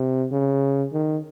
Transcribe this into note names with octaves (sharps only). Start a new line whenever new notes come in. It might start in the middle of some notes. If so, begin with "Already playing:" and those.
Already playing: C3
C#3
D#3